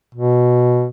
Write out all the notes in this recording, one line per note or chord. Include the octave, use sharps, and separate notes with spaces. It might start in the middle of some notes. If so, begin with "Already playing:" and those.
B2